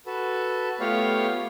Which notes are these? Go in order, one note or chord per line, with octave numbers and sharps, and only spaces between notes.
F#4 A4 B4
A3 B3 F4 G4 C#5 F5